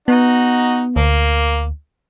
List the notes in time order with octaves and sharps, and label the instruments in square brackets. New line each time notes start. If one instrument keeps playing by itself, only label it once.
[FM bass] B3 [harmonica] D#4 F#4
[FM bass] D2 [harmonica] A#3